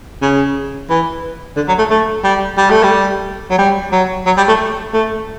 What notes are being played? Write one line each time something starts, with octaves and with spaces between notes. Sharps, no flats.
C#3
E3
D3
F#3
A3
A3
G3
G3
A3
G3
F#3
G3
F#3
F#3
G3
A3
A3